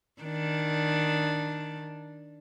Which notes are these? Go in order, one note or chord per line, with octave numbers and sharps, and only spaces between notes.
D#3 D4